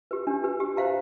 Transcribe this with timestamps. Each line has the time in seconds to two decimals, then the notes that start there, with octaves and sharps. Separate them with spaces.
0.11 G4 B4
0.27 D4
0.44 G4 B4
0.60 G4
0.77 C5 F5 A#5